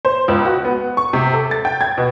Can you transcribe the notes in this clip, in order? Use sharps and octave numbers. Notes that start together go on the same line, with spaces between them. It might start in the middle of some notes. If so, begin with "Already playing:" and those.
C5
C#2
F#4
B3
C#6
C3
A4
A6
G5
G#6
B2